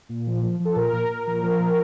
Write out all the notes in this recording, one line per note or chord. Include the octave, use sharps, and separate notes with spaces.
A#2
F3
F3
F3
A4
A#2 A#4
A#2
A#2
F3
F3
A#2